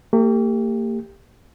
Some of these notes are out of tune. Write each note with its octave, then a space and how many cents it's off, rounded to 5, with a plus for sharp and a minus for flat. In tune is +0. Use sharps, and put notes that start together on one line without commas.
A#3 -40 G4 +20